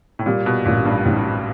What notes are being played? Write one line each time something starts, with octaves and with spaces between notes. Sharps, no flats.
A2
A#2 G3
B2
A1 A#2
G2
A1 G#2